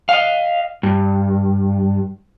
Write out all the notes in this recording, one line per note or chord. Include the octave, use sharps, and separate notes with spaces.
D#5 F5
G2